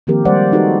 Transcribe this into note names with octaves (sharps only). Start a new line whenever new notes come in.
D#3 F3 A#3 C4 G4 A#4
G3 G#3 C5 D5 F#5
D#4 F#4 G4 A4 B4